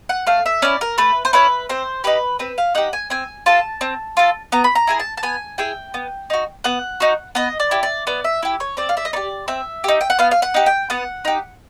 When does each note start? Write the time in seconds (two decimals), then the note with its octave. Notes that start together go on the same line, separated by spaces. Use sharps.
0.09 F#5
0.27 A3 F5
0.46 E5
0.62 C#4 E4 D5
0.81 A#4
0.98 A3 B4
1.25 C5
1.33 C#4 E4 B4
1.69 C4 C5
2.04 D#4 G4 B4
2.39 C4 B4
2.58 F5
2.75 D#4 G4 F#5
2.93 G#5
3.10 C4 G#5
3.46 F4 A4 A5
3.81 C4
4.17 F4 A4
4.52 B3 A#5
4.64 B5
4.75 A#5
4.87 E4 G#4 G#5
4.99 A5
5.17 A5
5.23 B3 G#5
5.58 E4 G#4 G5
5.94 B3
6.30 D#4 F#4
6.64 B3 F#5
7.00 D#4 F#4
7.35 B3 D#5
7.60 D5
7.71 E4 G4
7.83 D5
8.07 B3 D5
8.24 E5
8.43 E4 G4
8.60 C#5
8.77 C4 D5
8.89 F5
8.97 E5
9.05 D#5
9.13 D#4 G4 D5
9.48 C4 E5
9.84 D#4 G4
10.01 G5
10.10 F#5
10.19 B3 F5
10.31 F5
10.42 F#5
10.54 D#4 G4
10.66 G5
10.90 B3 F#5
11.25 D#4 G4